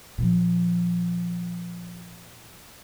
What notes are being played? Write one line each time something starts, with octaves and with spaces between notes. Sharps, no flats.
A#2 F3